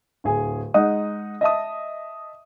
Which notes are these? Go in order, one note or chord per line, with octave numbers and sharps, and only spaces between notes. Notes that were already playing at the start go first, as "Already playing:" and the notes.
D1 G#4 G#5
G#3 D#4 F#5 D#6
D#5 E5 A5 D#6